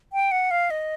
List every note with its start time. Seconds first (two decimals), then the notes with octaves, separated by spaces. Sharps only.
0.13 G5
0.31 F#5
0.51 F5
0.70 D#5